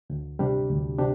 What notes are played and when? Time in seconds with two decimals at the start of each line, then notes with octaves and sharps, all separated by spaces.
0.10 D2
0.39 C3 G3 D4 G4
0.70 D2
0.99 C3 D4 G4